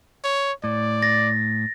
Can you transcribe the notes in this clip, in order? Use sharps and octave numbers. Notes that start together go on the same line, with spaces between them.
C#5
A2 D5
A6 A#6